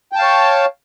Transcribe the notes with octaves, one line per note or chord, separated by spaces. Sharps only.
C#5 F5 G5 A5